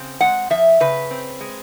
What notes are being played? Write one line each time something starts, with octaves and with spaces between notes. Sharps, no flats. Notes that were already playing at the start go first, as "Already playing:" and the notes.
Already playing: C#3 C4
G#3 F#5
F3 E5
C#3 B4
C4
G#3